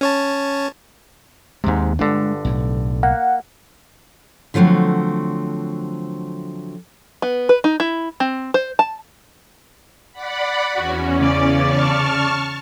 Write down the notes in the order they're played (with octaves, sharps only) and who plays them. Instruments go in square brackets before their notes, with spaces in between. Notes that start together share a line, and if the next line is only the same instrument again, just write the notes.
[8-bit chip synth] C#4 C#5 A5
[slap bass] D#2 G#3 [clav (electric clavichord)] G#2 C3
[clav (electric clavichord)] G1 D3 [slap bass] G#3 B3 D4
[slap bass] B1 A2
[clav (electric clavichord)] A#3 [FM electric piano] F#5
[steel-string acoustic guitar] D3 F3 F#3 A3 C4
[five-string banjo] B3
B4
D#4
E4
C4
C5
A5
[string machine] D5 F#5 B5
[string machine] E2 C#4 [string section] F#4
[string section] C#3 D5
[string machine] A5 C#6 F6